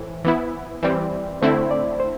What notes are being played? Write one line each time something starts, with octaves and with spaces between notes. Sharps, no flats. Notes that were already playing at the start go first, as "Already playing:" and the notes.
Already playing: A2 E3 C5
E3 B3 E4
E3 G3 C4 D5
D3 A3 C4 E4 C5
D5
C5